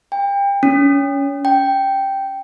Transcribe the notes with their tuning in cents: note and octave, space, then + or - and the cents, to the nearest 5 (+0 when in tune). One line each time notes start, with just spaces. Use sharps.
G5 +30
C#4 +20
G5 -5